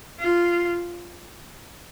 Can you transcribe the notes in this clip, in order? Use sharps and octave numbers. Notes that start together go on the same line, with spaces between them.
F4